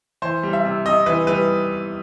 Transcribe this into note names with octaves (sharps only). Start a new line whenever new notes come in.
E3 C5
G3
E5
C3
C3 D#5
E3 B4
G3 B4